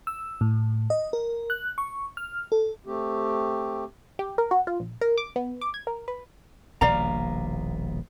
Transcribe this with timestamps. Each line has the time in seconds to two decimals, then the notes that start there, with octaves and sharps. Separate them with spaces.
0.07 E6
0.41 A2
0.90 D#5
1.13 A#4
1.50 F#6
1.78 C#6
2.17 F6
2.52 A4
2.86 A3 C4 G4
4.19 G4
4.38 A#4
4.51 F#4
4.67 F4
4.80 A#1
5.01 A#4
5.18 D6
5.36 B3
5.61 D6
5.74 G#6
5.87 A#4
6.08 B4
6.81 D#1 A#1 B2 D5 F5 A#5